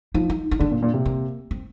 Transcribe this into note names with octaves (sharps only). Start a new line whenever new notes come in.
F3 D#4
D#4
D#4
D3 D4
A#2
A#2
C3
A#3
C4